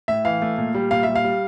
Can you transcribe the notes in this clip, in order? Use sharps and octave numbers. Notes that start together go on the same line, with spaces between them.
A2 E5
E3 F5
A3
A#2
G3
A#2 F5
G3 E5
F5
G3